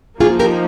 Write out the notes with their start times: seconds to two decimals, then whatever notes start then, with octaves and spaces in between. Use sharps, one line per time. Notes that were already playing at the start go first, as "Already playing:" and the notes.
0.20 F3 A#3 D#4 F4 G#4
0.39 G4 A#4